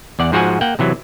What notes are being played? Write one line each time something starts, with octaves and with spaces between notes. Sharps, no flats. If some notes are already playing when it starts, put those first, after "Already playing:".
E2 D5 F#5
G#2 F3 F#4 F#5 G#5
A#3 F#5 G5
C3 E3 F#3